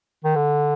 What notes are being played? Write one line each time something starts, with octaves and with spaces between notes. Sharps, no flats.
D#3
D3